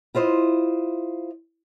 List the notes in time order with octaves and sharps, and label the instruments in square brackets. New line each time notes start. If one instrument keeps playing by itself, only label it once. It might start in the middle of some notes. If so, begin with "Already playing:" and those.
[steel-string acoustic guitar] E4 F4 C5 D#5